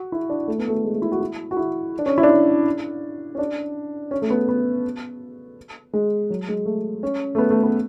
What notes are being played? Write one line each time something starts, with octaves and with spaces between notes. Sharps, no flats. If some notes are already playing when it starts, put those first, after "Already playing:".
Already playing: F#4
E4
D4
A3
B3
A3
G#3
A3
E4
F#4
E4
F#4
E4
D4
C#4
E4
D4
E4
C#4
D4
C#4
A3
B3
B3
G#3
F#3
G#3
A3
C#4
A3
B3
A3
B3